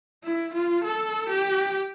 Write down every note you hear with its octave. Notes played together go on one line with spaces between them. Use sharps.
E4
F4
A4
G4